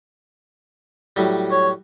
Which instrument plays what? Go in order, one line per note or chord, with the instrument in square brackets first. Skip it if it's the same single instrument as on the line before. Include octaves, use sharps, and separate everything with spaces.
[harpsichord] A2 F#3 G3
[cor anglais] C#5